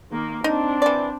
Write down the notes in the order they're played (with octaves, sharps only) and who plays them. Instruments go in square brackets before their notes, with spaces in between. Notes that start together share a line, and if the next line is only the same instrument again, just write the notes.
[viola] D#3 A#3
[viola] C4 D4 [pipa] D#4
[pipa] E3 D5